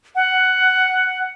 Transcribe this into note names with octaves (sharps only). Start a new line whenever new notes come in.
F#5